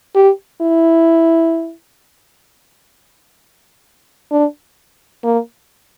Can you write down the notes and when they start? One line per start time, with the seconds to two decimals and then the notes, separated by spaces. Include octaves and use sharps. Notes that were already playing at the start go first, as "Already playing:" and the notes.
0.16 G4
0.61 E4
4.31 D4
5.24 A#3